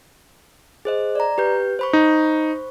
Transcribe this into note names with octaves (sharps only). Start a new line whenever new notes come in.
G#4 C5 D#5
D5 A#5
G4 B4 G6
C5 B5 C#6
D#4